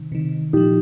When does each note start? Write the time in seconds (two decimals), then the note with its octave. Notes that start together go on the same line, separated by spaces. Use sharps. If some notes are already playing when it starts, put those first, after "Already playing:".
Already playing: C3 D#3
0.12 C3 D#3
0.53 A#2 F3 D#4 G4